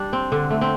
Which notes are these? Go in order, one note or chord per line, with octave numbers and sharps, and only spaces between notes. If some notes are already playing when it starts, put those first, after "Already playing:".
Already playing: G3 D4
C4
D3
A3
C4